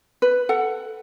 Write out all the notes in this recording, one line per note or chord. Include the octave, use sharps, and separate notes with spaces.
B4
A4 F#5